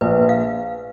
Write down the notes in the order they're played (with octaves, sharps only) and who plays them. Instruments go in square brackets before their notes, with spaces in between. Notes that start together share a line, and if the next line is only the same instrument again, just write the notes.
[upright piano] A#1 [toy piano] B4
[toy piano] F5